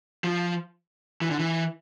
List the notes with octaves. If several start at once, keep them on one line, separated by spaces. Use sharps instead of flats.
F3
E3
D3
E3